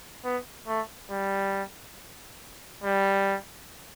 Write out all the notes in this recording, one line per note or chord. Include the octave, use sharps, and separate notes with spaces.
B3
A3
G3
G3